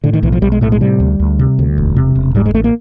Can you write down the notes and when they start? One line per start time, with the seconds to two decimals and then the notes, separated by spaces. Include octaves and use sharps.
0.04 A2 D3
0.14 D#3
0.23 B1 E3
0.32 F3
0.42 B1 G3
0.52 G#3
0.61 A2 A3
0.72 G#3
0.81 C3 G3
1.00 D2
1.20 D2
1.39 C3
1.59 D2
1.78 E1
1.96 C3
2.15 E1
2.35 G#2 G3
2.46 G#3
2.54 A1 A3
2.64 A#3